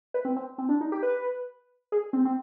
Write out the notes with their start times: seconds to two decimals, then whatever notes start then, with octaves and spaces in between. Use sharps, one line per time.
0.14 B4
0.25 C4
0.36 C4
0.58 C4
0.69 D4
0.81 D#4
0.92 G4
1.03 B4
1.92 G#4
2.13 C4
2.25 C4